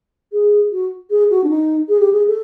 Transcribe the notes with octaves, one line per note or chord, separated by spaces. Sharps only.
G#4
F#4
G#4
F#4
D4
D#4
G#4
G4
G#4
A4